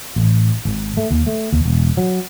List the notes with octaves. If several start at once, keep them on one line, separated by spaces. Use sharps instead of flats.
A1
G#1
A3
D#2
A3
D#2
E1
F#3